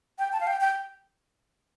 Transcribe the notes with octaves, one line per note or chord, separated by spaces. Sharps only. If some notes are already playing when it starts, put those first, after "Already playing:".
G5
A5
F5
G5
G5